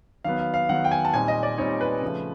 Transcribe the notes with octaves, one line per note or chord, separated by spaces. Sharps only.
D#3 F#3 B3 F5
F5
F5
D#3 F#3 B3 F#5
G5
G#5
A5
A#2 G3 C4 D#4 G#5
D#5
D5
A#2 G3 C4 D#4 C#5
B4
C#3 F3 A3